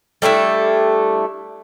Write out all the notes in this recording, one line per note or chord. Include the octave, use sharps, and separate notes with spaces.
G3 A3 D4 E4